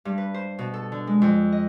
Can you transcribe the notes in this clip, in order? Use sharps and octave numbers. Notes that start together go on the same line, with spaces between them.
G2
B4
C5
B2
A4
D3
G#3
F2
D#5